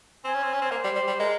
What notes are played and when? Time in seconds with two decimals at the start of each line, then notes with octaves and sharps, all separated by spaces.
0.24 C4 G#5
0.34 C#4
0.43 C4
0.53 C#4
0.62 C4
0.71 A#3 C5
0.84 G3
0.95 G3
1.07 G3
1.20 G#3 A#4